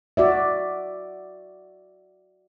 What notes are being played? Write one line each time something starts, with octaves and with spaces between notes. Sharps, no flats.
F#4 D5 E5